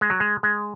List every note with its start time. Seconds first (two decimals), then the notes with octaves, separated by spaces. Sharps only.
0.01 G#3
0.10 F#3
0.20 G#3
0.43 G#3